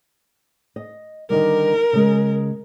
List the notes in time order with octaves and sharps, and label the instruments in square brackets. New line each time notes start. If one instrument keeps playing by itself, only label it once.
[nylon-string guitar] D#5
[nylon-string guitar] D3 D#3 G3 [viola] A#4
[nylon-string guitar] C#3 G#3